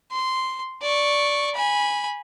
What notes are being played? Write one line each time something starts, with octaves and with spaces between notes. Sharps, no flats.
C6
D5 C#6
G#5 B5